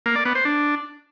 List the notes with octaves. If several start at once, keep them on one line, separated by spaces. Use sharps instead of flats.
A#3
D5
B3
C5
D4